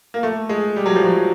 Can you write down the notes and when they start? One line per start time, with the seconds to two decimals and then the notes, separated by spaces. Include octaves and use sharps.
0.14 A#3
0.23 A3
0.49 G#3
0.76 G3
0.86 F#3
0.95 F3
1.05 F#3